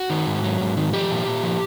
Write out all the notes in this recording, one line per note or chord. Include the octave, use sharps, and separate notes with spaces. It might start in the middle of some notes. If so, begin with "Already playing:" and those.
Already playing: F#4
D#3
G#2
F#3
G#2
D#3
F3 G4
A#2
A#2
F3